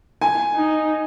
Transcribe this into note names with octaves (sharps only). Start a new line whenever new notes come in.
G#5
D#4